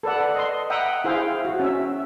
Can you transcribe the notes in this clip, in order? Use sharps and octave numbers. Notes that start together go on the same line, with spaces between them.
A4 B4 D5 F#5
D#5 C6
E5 F#5 G5 A#5 B5 D#6
E4 G#4 C5 F5 G5
F#4
C#4 E5